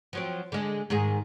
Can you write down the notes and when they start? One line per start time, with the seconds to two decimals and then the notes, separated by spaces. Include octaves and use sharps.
0.13 F3 F#3 C4
0.52 D3 G#3
0.90 G#2 D#3 G#4